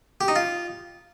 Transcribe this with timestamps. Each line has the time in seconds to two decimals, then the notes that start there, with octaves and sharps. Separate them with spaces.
0.21 G4
0.28 D#4
0.36 F4